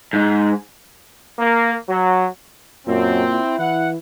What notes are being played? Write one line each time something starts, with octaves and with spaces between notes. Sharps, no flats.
G#2
A#3
F#3
F#2 A#2 C4
E4
E3 F#5